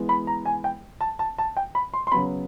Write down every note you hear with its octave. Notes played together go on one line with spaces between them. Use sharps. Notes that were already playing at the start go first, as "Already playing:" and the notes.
Already playing: E3 G#3 B3
B5
A#5
G#5
G5
A5
A5
A5
G5
B5
C6
C6
C#3 F#3 B3 B5